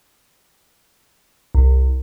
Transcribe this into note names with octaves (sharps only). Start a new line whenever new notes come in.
C2